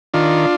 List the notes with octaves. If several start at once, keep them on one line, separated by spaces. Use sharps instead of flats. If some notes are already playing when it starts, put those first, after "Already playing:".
D#3 D4 F4